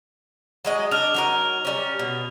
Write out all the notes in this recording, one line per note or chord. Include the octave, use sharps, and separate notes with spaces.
F#3 G#3 D#5
D4 F6 F7
F#3 D#4 A#4
G3 C#4
B2